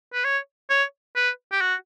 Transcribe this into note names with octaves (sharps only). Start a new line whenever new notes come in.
B4
C#5
C#5
B4
G4
F#4